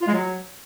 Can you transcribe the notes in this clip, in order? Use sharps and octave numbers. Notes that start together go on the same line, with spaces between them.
F4
G#3
F#3